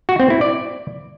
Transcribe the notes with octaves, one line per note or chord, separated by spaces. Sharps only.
F#4
C4
E4
D5